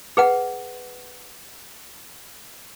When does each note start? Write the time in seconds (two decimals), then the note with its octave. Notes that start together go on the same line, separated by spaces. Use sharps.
0.17 G#4 B4 F#5